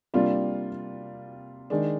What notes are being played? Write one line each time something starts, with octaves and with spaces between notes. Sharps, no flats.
C3 G3 A#3 D4 F4
D#3 G#3 D4